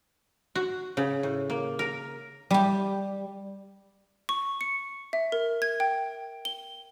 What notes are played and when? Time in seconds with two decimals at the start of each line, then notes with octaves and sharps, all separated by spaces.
0.55 F#4
0.97 C#3
1.23 A2
1.50 A#3
1.79 A#4
2.51 G3 G4
4.29 C#6
4.61 C#7
5.13 E5
5.32 A#4
5.62 G#6
5.80 G5
6.45 G7